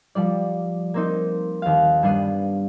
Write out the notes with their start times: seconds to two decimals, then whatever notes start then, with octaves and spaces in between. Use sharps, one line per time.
0.15 F3 G3 D5
0.94 A#3 C4 D#4
1.62 D#2 F5
2.03 G2 G3 B3 D4 C7 D#7